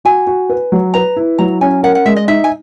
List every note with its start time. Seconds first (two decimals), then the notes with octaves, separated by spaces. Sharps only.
0.05 F#4 G#5
0.27 F#4
0.50 B4
0.72 F#3
0.94 B4 A#5
1.16 E4
1.38 F#3 A#5
1.61 C#4 G#5
1.83 A#4 F#5
1.95 F#5
2.06 G#3 E5
2.16 D#5
2.28 D#4 E5
2.44 G#5